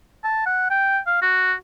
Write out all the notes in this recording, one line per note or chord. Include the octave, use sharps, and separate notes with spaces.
A5
F#5
G5
F5
F#4